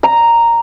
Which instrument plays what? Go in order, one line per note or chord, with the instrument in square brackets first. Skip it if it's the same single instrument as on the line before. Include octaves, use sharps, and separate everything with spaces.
[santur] A#5